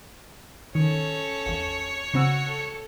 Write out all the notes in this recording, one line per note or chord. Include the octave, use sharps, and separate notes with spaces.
D#3 C#4 A4 C#5
G#1 E2
C#3 C4 F#4 E6
A4